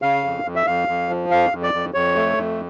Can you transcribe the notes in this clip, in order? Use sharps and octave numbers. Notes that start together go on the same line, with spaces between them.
C#3 F5
F2
F2
E5
F2 F5
F2
F3
F2 F5
F2
D5
F2
F2 C#5
A3
F2